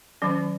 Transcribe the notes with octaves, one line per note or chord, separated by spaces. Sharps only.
D#3 F#3 C#4